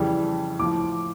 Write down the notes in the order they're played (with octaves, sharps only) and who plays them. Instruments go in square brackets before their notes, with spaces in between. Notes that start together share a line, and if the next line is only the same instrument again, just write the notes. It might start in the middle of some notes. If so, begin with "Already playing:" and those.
Already playing: [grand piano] F2 C#3 E3 G3
A2 F3 D6